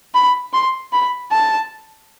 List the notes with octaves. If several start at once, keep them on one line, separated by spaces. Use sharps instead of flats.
B5
C6
B5
A5